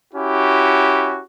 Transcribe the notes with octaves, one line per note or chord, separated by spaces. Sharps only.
C#4 E4 F#4 G4